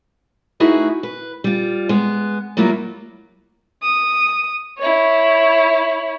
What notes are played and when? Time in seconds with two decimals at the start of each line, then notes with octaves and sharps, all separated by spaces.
0.60 A3 D#4 E4 F#4 G#4 B4
1.03 B4
1.44 G3 F4
1.89 G#3 B3
2.57 F#3 G3 A#3 E4 F4
3.83 D#6
4.79 E4 C#5